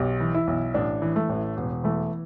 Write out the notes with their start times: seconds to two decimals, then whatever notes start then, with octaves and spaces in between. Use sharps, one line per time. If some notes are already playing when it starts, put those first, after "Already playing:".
Already playing: B1 G4
0.20 E3
0.34 E4
0.47 B1
0.74 A1 D4
1.02 E3
1.16 A3
1.29 A1
1.57 E1
1.84 E3 A3